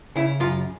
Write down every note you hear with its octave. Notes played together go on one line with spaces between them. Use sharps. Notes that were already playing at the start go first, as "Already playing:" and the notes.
C#3 E4
F#2 F4